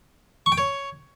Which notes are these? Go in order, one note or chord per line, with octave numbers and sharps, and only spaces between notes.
C#6
G5
C#5